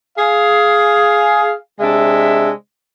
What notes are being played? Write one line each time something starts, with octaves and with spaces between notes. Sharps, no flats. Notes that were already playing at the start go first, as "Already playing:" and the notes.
G#4 F5
C3 G#3 D4 E5